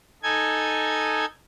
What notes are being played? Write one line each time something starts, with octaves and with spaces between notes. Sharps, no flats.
D#4 A4 G#5 G#6